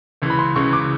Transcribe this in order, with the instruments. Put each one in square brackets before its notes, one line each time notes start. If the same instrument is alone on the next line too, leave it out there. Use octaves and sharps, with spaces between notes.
[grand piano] C#2 C#3 E3
B5
C6
C#2 C#3 E3 C#6
D6